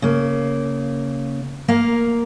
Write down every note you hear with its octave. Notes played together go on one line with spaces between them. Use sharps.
C#3 A#3
A#3 A#4 F5